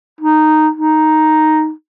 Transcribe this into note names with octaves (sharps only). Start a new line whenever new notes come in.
D#4
D#4